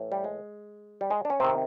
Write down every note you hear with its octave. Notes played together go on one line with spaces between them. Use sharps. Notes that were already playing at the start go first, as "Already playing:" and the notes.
Already playing: A2 E3
G3
G#3
G3
G#3
D4
C#4
C3 D#3 C4